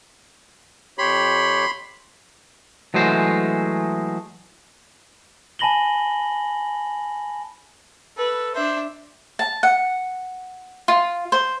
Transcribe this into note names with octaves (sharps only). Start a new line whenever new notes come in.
F2 G4 C#5 B5 C6
E3 F#3 G#3 A3 C5
G#5 A5 B5 A#6 F#7 G7
A4 B4
D4 C5 E5
A5
F#5
F4
C5